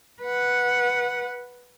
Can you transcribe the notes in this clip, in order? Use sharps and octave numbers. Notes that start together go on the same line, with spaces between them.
B4 F#5